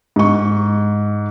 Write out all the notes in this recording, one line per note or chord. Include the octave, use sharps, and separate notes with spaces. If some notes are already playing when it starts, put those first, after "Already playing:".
G#2 C#6